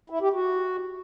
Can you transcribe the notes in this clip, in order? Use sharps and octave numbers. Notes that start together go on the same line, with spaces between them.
E4
G4
F#4